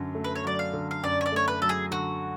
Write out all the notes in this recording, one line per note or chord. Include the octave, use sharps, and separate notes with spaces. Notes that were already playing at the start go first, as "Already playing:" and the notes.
Already playing: F#2 D3 F#3
A3
B4
C#5
F#3 D5
F5
D3
F5
F#2 D5
C#5
D5
A3 C#5
B4
F#3 A4
G#4
D3 F#4